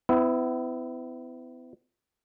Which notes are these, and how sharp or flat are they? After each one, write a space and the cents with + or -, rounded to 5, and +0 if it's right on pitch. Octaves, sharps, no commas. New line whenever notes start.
B3 +45 E4 +0